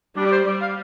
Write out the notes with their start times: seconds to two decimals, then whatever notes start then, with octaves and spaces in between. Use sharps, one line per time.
0.16 G3 D4
0.25 D5
0.31 C5
0.46 G3 D5
0.61 F5